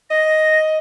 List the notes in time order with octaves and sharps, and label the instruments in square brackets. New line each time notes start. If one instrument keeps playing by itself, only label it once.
[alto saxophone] D#5 [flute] A#6